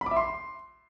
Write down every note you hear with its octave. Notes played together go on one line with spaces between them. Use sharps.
B5
D6
E5
C6